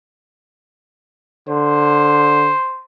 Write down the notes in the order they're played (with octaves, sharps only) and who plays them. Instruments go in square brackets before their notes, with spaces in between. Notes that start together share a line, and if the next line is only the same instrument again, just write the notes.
[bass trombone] D3 [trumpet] C5